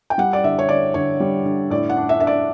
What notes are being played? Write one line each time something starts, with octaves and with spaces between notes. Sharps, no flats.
G5
G3 F#5
D5
D3 E5
C#5
D3 D5
D3 C#5
G3
D3
A2 D5
F#5
D4
E5
D4 E5
D5